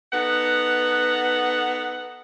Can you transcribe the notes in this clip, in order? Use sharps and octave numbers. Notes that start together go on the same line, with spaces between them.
B3 D#4 A4 F#5